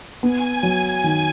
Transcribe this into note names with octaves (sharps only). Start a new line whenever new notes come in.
B3 G#5
F#3
D#3